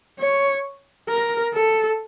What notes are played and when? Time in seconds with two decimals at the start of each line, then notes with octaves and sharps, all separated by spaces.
0.19 C#5
1.09 A#4
1.54 A4